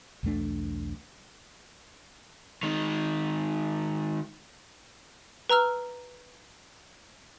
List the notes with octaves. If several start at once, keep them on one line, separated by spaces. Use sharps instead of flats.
B1 E2 A3 D4
D#3 G#3
B4 A#5 E6 F6